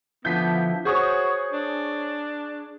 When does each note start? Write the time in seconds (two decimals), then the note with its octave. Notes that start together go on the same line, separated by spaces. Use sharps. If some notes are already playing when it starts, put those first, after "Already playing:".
0.25 D3 F3 B3 E4 G6 B6
0.85 F#4 G#4 C5 C#5 C#6 D#6
1.53 D4